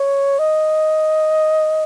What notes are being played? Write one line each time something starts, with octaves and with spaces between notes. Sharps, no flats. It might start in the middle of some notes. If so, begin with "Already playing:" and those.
Already playing: C#5
D#5